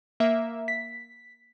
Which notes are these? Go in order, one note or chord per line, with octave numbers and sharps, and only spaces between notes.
A#3 E5
B6